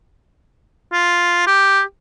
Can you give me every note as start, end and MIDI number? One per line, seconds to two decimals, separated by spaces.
0.93 1.45 65
1.47 1.81 67